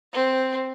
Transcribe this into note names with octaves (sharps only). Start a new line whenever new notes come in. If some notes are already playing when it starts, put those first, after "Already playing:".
C4